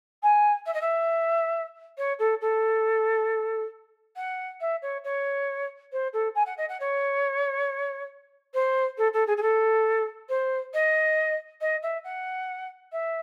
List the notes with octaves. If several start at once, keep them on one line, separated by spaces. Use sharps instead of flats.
G#5
E5
D#5
E5
C#5
A4
A4
F#5
E5
C#5
C#5
C5
A4
G#5
F#5
D#5
F#5
C#5
C5
A4
A4
G#4
G#4
A4
C5
D#5
D#5
E5
F#5
E5